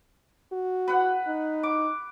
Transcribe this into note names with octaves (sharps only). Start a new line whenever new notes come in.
F#4
B4 F#5
D#4
D6